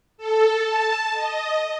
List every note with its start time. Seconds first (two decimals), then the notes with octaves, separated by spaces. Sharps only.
0.18 A4
0.57 A5
1.14 D#5